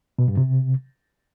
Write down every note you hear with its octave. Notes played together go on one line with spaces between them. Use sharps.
B2
G2
C3